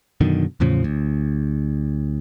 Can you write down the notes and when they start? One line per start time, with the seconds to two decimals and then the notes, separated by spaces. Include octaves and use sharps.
0.21 F#2 B2 D3 D#3
0.60 E2 A2 C#3 F3
0.84 D2